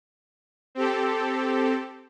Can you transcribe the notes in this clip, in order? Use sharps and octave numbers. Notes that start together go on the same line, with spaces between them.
C4 G4 A4